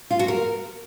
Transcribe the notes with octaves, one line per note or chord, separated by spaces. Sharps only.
F4
F#4
A#4